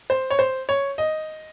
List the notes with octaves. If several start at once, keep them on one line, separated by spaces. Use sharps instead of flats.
C5
C#5
C5
C#5
D#5